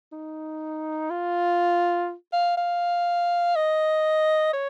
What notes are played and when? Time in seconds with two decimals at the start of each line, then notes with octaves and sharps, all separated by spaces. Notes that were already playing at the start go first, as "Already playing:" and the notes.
0.12 D#4
1.11 F4
2.33 F5
2.57 F5
3.56 D#5
4.53 C#5